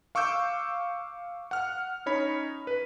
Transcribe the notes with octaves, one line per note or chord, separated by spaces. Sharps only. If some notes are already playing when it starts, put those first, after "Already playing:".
F5 C#6 D6 E6 G6
F#5 F6
C#4 D#4 C#5 B5
B4